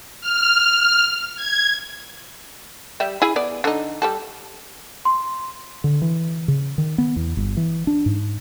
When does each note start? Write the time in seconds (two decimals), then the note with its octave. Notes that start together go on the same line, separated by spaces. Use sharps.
0.21 F6
1.36 G#6
3.00 G3 G4 E5
3.22 E4 G#4 G#5
3.36 B3 D5
3.64 D3 D#4
4.02 G3 G4 A4
5.05 C6
5.84 D3
6.02 E3
6.48 C#3
6.78 D#3
6.98 B3
7.16 E2
7.37 G1
7.57 E3
7.87 D4
8.06 G#2